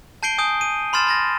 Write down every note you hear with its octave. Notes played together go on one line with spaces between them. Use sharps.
A5 G6 C7 D7 G7
G#5 D#6 G6 D7
D#7
B5 C6 F6 A6 E7
B5 A6 A#6